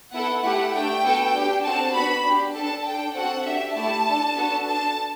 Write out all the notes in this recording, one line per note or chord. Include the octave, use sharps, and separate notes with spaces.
B3 E4 A4 F#5
A3 E4 G4 F#5
A3 D4 G4 G5
B3 F#4 A4
D4 G4
C4 F#4 A4 A5
B3 D4 F#4 B5
D4 G4
D4 A4 A5
D4 A4 G5
C4 F#4 A4 F#5
D4 G4 E5
A3 E4 G4 A5
D4 A4
B3 D4 F#4 A4
D4 A4 A5